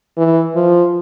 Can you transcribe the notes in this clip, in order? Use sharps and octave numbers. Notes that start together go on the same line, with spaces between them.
E3
F3